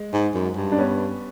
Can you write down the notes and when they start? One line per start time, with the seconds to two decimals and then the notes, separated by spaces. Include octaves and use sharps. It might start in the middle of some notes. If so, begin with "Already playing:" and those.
Already playing: G#3
0.13 G#2
0.34 F#2
0.56 G2
0.72 D4
0.78 B3 C#4